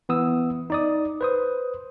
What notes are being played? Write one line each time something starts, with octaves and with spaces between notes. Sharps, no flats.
E3 B3 D#6 E6
D#4 D5 D#6
B4 C5 D#6